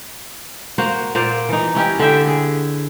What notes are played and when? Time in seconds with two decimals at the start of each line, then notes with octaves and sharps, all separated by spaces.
0.78 A#3 F#4 C5
1.15 A#2 A#3 C5 D5
1.49 E3 D#4
1.75 C#4 E4 G4 D#5
1.99 D3 G4 E5 G5
2.27 G#4